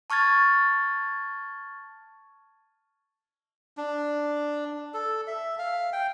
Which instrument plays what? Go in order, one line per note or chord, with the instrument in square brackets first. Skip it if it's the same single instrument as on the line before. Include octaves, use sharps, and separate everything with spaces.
[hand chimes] A5 C#6 F6 G#6 A6
[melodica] D4
A4
E5
F5
G5